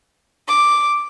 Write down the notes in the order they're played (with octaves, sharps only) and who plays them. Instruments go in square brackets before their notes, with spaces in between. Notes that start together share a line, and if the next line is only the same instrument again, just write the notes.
[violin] D6